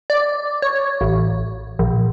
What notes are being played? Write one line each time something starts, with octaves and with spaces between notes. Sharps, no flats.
D5
C#5
A1
A#1